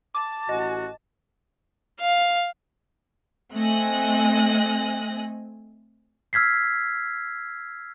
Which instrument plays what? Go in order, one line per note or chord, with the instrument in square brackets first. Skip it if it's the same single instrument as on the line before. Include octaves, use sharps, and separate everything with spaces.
[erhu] A5 [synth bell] D6
[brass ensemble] A1 F#4 [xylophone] D#5
[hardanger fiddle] F5
[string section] A3 C4 D#5 G#5 F#6 A#6
[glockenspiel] E6 F6 G#6 B6 C7